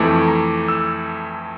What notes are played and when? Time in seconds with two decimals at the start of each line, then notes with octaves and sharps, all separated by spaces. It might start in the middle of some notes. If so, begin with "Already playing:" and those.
Already playing: F2 E3 A3 D6
0.28 A#5
0.68 E6